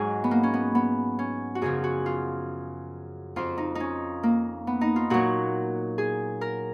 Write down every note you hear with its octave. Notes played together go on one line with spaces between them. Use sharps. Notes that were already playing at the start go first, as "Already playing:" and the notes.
Already playing: G#2 F#3 G#4
B3
A#3
C#4
B3
B3
C#4
F#4
F#2 C#3 F3 G#4
F#4
F4
F2 F3 F4
D#4
C#4 D#4
A#3
B3
D#4
F4
A#2 F#3 F#4
G#4
A#4